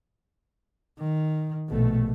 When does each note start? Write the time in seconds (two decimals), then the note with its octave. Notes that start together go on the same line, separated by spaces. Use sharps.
0.99 D#3
1.69 A#1 B2 A3